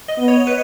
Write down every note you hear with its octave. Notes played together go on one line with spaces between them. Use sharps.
D#5
B3
C#5
B4